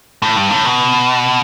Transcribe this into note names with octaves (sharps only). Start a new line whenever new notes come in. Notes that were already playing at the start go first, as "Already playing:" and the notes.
A2
G2
A2
B2